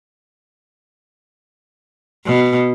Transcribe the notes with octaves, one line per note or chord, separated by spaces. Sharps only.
B2